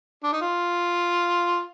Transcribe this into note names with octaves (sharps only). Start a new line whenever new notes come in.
D4
D#4
F4